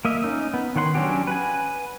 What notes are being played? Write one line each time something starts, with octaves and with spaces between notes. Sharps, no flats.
A#3 D#5 E5
C#4 D#4
B3
D#3 C#5 F#5 C6
F#3 C#4 D4 F#4 G4
B4 F#5 G#5